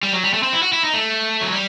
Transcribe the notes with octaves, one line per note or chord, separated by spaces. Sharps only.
G3
F#3
G3
A3
C4
E4
F#4
E4
D#4
A3
F#3
G3